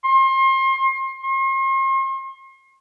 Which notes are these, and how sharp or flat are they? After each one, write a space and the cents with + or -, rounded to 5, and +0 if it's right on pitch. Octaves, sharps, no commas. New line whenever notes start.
C6 +35
C6 +45